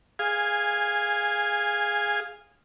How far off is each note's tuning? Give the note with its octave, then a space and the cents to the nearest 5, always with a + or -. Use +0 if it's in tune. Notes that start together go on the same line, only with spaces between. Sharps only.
G#4 +0 F5 +0 G#5 -15